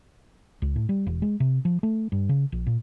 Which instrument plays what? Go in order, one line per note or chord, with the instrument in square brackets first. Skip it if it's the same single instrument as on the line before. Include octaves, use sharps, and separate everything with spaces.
[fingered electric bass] C#2
A2
G3
E1
G#3
C3
F3
A3
G2
C#3
A#1
A#2